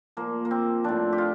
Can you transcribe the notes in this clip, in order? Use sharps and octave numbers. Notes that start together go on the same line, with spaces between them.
A#2 F3 A#3
A#3
C4
A2 F3 D4
G4
F4